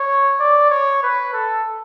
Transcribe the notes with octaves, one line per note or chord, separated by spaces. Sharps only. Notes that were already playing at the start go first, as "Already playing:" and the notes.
Already playing: C#5
D5
C#5
B4
A4